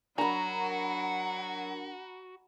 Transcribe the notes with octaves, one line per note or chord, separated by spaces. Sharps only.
F#3 D4 F#4 A#4 A#5 B5